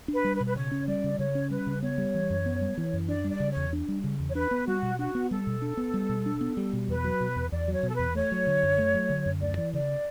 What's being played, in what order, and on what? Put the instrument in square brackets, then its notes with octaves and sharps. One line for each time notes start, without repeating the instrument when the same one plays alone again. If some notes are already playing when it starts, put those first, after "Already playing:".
[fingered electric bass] D4
[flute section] B4
[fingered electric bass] G3
[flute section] B4
[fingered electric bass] B2
[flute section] B4
[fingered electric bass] C#3 [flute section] C#5
[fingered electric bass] C#4
[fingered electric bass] G3 [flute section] D5
[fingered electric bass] C#3
[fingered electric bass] C#3 [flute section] C#5
[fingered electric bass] C#4
[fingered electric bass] G3 [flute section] B4
[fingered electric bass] C#3
[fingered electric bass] B3 [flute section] C#5
[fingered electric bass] G3
E3
F#2
B3
G3
E3
F#2
[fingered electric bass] D4 [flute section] D5
[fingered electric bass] G3
[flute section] D5
[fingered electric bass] C#3
[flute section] C#5
[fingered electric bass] E2
D4
G3
C#3
E2
[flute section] C#5
[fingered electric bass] D4 [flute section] B4
[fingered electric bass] B3
[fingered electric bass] G3 [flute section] F#4
[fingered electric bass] B2
[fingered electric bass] D4 [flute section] F#4
[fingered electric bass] B3
[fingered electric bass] G3 [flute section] A4
[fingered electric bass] B2
D4
B3
G3
B2
D4
B3
G3
B2
[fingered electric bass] E2 [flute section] B4
[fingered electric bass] F#3
B2
E2
[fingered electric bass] E2 [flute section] D5
[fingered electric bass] F#3 [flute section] C#5
[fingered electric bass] B2
[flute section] A4
[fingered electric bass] E2 [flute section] B4
[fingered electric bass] A3 [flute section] C#5
[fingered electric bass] F#3
D3
F#2
A3
F#3
D3
F#2
[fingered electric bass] D2 [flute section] D5
[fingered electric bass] E3
[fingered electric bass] C#3 [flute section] D5